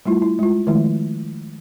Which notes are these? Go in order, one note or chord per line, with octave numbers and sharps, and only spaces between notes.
G3 A3 E4 F4
E4
G#3 F4
D#3 F3 G#3 A3 E4